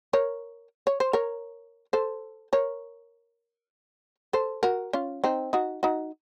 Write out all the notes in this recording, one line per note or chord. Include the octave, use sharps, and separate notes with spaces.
A#4 C#5
C#5
C5
A#4 C#5
A4 C5
A#4 C#5
A4 C5
F#4 A#4
C#4 F4
C4 D#4
D#4 F#4
D#4 F#4